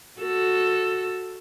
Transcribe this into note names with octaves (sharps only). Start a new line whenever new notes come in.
F#4 A4